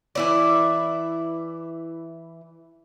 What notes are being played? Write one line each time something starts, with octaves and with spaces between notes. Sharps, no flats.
E3 E4 D5